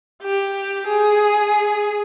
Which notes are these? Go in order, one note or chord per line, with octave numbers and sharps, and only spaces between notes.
G4
G#4